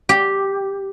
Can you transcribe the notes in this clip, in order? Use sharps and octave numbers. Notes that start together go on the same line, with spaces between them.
G4